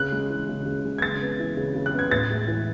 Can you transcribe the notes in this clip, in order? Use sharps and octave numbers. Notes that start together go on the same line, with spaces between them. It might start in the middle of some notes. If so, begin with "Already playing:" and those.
Already playing: C#3 F#6
G#3
E3
C#3
C#3
G#3
G#6
C#3 A6
B3
E3
C#3
C#3
F#6
B3
G#6
A2 A6
G#3
E3